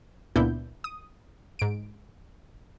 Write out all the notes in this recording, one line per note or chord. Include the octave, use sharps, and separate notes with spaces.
C#2 A#2 B3 D4 E4 G6
D#6
G#2 D7